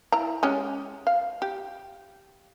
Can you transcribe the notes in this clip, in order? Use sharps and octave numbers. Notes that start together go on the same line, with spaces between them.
E4 A#5
G#3 C#4 G4
F5
G4